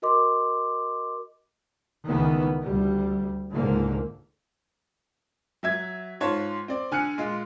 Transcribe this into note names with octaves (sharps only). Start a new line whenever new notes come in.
F#4 A#4 D#5 C6 D6
C#2 D#3 E3 B3
D2 G3
C#2 G#2 D3 A#3
F#3 E5 G#6
G#2 F4 C#5 A5
C4 D5
D3 G#5 F6 F#6 C#7
A#2 G#3 F4